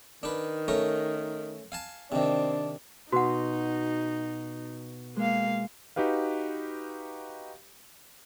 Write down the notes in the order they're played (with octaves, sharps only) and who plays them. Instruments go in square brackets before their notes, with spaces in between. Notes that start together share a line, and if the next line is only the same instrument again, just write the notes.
[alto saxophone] D#3 [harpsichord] D4 B4
[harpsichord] A3 C#4 A#4
F5 G#5 A5
[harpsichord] C3 D#3 [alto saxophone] C4 [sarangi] D4
[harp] B2 [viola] D#4 [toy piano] F#4 F#5
[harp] G#3 [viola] A#3 F5
[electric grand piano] D#4 F#4 G4 B4 F5